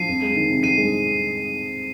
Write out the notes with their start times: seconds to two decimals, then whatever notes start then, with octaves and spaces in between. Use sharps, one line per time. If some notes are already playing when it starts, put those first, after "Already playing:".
Already playing: F3 C7 D#7
0.08 F2
0.22 G#3
0.35 D#3
0.50 C3
0.63 F2 C7 D#7
0.77 G#3